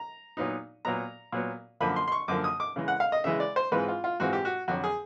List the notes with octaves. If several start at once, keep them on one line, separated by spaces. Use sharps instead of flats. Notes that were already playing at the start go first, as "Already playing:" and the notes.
Already playing: A#5
A#2 F#3 B3 D#4
A#2 F#3 B3 A#5
A#2 F#3 B3
F#2 D3 F3 A#3 B5
C6
C6
C#6
F#2 D3 F3 A#3 D6
D#6
D6
C#3 E3 G#3
F#5
F5
D#5
C#3 E3 G#3 E5
D5
C5
G#2 E3 G#3 C4 F4 B4
F4
F4
G#2 E3 G#3 C4 F4 F#4
G4
F#4
F2 D3 F#3 F#4
G#4